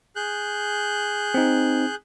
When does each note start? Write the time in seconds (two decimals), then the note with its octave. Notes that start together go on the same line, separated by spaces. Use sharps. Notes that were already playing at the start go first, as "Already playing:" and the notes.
0.16 G#4 F#6 G6
1.34 C4 D#4